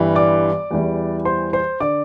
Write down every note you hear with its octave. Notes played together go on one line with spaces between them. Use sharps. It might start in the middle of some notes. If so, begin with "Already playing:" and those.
Already playing: G1 G2 E3 G3
D5 D6
E2 E3 G3
C5 C6
C5 C6
D3 D5 D6